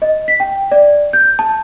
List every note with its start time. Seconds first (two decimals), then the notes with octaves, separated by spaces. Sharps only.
0.02 D#5
0.28 B6
0.40 G5
0.71 D5
1.13 G6
1.39 A5